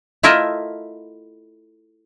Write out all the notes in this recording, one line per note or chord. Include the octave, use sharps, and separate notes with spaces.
A3 E4 F4 A#4 D#5 E5